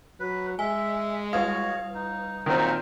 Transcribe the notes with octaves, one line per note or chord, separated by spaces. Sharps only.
F#3 B4
G#3 E5 G#5
G3 F#4 B4 C#5 F5 D#6
D#4
A#2 D#3 F#3 C4 D#4 A#4